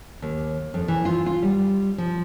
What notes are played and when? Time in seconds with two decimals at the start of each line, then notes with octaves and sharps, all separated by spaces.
0.22 D#2
0.74 F2
0.88 E3
1.05 F4
1.26 F4
1.42 G3
1.98 F3